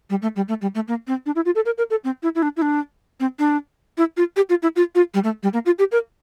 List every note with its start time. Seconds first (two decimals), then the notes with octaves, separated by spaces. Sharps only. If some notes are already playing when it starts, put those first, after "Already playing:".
0.10 G3
0.22 A3
0.36 G3
0.48 A3
0.62 G3
0.75 A3
0.88 A#3
1.07 C4
1.26 D4
1.36 E4
1.45 F4
1.55 A4
1.65 A#4
1.78 A#4
1.90 A4
2.04 C4
2.23 E4
2.35 E4
2.42 D4
2.57 E4
2.62 D4
3.20 C4
3.39 D4
3.98 E4
4.17 F4
4.36 G4
4.49 F4
4.62 E4
4.76 F4
4.95 F4
5.14 G3
5.24 A3
5.43 G3
5.53 A#3
5.66 F4
5.79 G4
5.92 A#4